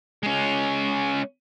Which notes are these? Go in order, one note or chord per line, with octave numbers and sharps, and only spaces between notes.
G#3 C#4